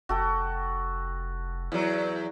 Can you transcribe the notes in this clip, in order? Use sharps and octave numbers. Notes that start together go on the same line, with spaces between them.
F1 F#4 A4 G5
E2 F#3